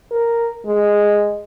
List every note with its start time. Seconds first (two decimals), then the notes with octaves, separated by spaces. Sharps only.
0.12 A#4
0.66 G#3